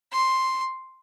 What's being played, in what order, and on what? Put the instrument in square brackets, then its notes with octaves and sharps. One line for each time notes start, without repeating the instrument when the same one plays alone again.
[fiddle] C6